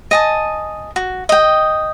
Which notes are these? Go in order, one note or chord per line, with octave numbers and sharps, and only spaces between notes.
D#5 G#5 A5
F#4
D#5 G5